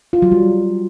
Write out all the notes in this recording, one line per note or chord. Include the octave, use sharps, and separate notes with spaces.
F4
F#3
G3